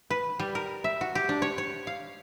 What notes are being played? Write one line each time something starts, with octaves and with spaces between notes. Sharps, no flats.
B4
G3
A#4
E5
F#4
G4
D4
C#5
C#5
F5